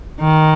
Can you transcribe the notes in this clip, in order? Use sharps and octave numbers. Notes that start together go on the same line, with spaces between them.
D#3